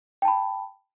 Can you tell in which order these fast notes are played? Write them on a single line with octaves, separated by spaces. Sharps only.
G5 A5 B5